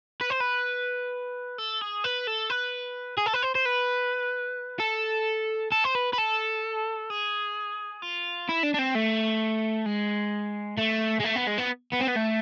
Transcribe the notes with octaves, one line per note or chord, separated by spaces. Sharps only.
B4
C5
B4
A4
G#4
B4
A4
B4
G#4
A4
B4
C5
C5
B4
A4
A4
C5
B4
B4
A4
G#4
F4
E4
D4
D4
C4
A3
G#3
A3
G#3
A3
B3
G#3
B3
B3
C4
B3
A3